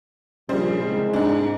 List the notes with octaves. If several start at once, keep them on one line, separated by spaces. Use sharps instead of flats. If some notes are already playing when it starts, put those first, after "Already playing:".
A#1 C#3 G3 C5
C2 G#3
G#2 D4